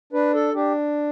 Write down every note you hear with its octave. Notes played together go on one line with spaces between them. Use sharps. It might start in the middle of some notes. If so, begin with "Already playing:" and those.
D4 B4
A4
D4 G4